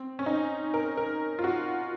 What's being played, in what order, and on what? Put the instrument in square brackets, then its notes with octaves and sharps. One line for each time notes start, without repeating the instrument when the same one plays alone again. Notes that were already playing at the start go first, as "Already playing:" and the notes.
Already playing: [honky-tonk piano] C4
C#4
D#4
A#4
A#4
F4
F#4